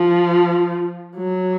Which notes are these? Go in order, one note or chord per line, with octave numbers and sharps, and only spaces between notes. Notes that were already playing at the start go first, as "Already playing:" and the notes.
Already playing: F3
F#3